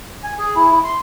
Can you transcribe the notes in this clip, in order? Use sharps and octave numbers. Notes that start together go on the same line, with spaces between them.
G#5
G#4
E4
E4
C6